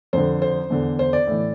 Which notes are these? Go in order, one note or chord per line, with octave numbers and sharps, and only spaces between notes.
F2 D3 C5
C5
E2 D3
C5
D5
A2 E3